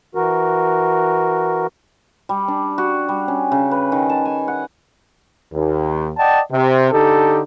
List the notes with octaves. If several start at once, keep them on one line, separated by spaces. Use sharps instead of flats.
E3 F#4 A#4
G3
D4
F#4
G3
C#4
C#3
B4
D#3
A5
G#5
F#5
D#2
D5 D#5 F#5 G5 A5
C3
D3 D#4 G4 A4